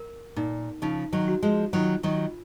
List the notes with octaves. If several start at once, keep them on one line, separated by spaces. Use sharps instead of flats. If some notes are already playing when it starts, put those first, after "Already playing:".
Already playing: A#4
A#2 D#4
C#3 F3 D#4
D#3 F#3
F#4
F3 G#3
D#3 F#3 F4
D#3 F#3
F4